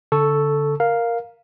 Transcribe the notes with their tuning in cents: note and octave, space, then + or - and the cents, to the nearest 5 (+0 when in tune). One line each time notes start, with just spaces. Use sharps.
D3 -30 A4 +0 C#6 +0
A#4 +0 F5 +0